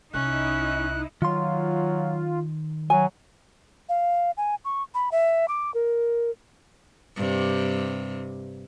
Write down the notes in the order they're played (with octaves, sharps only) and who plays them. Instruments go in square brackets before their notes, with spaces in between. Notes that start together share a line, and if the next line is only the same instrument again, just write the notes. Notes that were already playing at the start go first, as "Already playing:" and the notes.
[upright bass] C2 [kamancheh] C#4 [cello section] D#4 E4 [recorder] F#6
[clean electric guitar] D#3 C6 [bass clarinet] F#3 [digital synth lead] F4
[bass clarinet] F#3 [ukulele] G#5
[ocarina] F5
G#5
C#6
B5
E5
D6
A#4
[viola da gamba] G2 C3